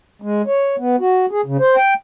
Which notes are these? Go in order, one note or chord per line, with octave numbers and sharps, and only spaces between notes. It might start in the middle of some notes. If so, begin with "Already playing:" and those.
G#3
C#5
B3
F#4
G#4
C#3
C5
G5